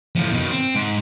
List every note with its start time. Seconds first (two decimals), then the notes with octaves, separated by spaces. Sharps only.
0.15 A2 F3
0.32 B2 D#3
0.51 C4
0.75 G#2